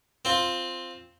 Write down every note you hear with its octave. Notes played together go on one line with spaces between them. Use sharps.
C4 F4